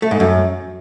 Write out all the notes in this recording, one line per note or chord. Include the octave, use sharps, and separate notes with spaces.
A3
G#2
F#2